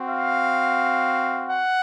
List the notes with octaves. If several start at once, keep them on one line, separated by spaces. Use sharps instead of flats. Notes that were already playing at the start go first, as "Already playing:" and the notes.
Already playing: C4 F#4
F5
F#5